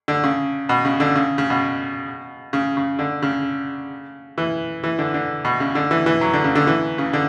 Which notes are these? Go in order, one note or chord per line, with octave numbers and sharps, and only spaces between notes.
D3
C#3
B2
C#3
D3
C#3
C#3
B2
C#3
C#3
D3
C#3
E3
E3
D3
D3
B2
C#3
D3
E3
E3
F#3
D3
C#3
D3
E3
C#3
D3